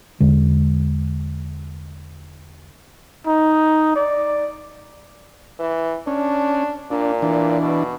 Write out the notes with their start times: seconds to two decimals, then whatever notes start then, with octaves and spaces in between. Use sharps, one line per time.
0.20 E2 D3 G#3
3.27 D#4
3.96 D5
5.59 E3
6.07 C#4 D4
6.91 A#2 D4
7.22 E3 D4
7.61 B2